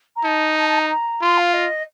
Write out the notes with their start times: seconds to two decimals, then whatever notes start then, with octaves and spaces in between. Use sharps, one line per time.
0.16 A#5
0.24 D#4 A5
0.57 A5
0.68 A5
0.78 A#5
0.90 A#5
1.21 F4 C6
1.37 F5
1.53 D#5